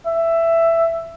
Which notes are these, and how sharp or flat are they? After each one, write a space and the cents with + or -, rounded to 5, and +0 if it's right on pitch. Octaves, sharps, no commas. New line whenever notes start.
E5 +10